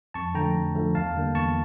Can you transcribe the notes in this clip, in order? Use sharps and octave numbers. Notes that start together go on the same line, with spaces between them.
F2 A5 C#6
D3 F3 A3 G5 A#5
F2
D3 F3 A3
E2 F5 A5
D3 G3 A#3
E2 A5 C#6